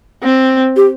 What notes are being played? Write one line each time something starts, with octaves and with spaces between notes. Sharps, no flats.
C4
G4